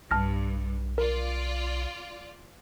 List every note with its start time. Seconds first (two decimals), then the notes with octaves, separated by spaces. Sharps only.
0.11 B1 G2 A5 F6 A#6
0.98 F4 A#4 D5